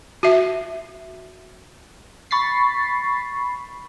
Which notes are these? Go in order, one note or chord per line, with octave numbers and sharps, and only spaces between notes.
F#4 E5
B5 C#6 A6 B6 C7